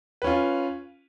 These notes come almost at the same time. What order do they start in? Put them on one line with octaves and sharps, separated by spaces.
B4 C#4 F4